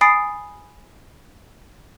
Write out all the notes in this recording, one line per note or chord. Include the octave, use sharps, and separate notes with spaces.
G#5 B5 D#6 A6 C7 D7